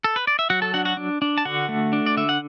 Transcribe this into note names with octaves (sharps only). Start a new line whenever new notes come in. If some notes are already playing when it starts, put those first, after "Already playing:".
A4
B4
D5
E5
F#3 F#4 F#5
A4 A5
D4 F#4 F#5
F#4 F#5
D4
D4
A5
D3 F#4 F#5
A3
D4
D5
D3 E5
F#5